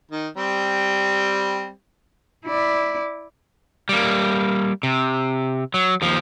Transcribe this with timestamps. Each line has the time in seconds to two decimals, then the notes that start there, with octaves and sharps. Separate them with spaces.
0.11 D#3
0.37 G3 C4
2.46 E4 D5
3.89 G3 A#3
4.83 C3
5.74 F#3
6.02 D#2 F3